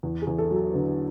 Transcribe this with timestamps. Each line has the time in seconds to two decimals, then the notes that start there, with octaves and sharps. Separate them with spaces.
0.03 E2
0.22 G#4
0.27 E2
0.38 A4
0.51 F#3
0.56 A4
0.74 D3 B4